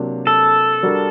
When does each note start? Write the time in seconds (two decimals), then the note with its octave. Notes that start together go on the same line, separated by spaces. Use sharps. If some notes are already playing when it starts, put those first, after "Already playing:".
Already playing: C3 F#3 A#3 D4
0.27 A4
0.83 G3 D4 F#4 A#4